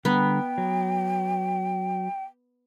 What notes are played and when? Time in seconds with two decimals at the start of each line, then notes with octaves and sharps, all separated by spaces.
0.05 D3 G3 B3 G5 A#5
0.58 F#3